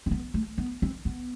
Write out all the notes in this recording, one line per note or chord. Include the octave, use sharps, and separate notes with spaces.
C4
B3
A3
B3
C4
B3